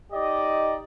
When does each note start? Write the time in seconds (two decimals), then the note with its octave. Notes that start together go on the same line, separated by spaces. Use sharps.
0.13 D#4 G4 D5 D#5